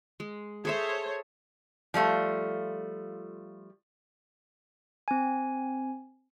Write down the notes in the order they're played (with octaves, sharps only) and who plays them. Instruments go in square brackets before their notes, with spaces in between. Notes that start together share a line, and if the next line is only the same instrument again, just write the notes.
[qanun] G#3
[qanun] G#4 A4 E5 [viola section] C5 C#5
[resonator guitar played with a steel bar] F3 G3 A3 F4
[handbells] C4 G#5